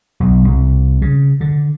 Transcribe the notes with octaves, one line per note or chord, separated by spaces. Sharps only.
B1
C2
C#3
D3